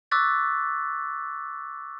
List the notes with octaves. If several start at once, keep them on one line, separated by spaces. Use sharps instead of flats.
C#6 D6 E6 F#6 A6 B6